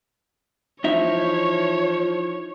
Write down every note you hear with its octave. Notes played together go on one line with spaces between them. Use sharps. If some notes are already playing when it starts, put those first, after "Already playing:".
E3 F3 D#4 C#5 E5